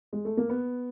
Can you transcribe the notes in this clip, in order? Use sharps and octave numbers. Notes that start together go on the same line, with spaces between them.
G#3
A3
A#3
B3